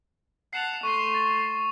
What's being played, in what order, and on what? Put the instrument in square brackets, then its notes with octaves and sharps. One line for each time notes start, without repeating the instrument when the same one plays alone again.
[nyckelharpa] F#5 A5 [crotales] C7 E7 F7
[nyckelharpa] A3 C6 [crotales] C#6 D#7 E7
[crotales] A6 F7